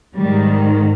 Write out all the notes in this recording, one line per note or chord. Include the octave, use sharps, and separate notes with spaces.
G#2 D#3 G3